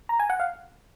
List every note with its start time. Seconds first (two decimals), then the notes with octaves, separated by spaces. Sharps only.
0.09 A#5
0.19 G#5
0.30 F#5
0.40 F5